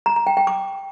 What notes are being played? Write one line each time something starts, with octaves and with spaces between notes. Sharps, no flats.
A#5
A#5
G5
G5
D6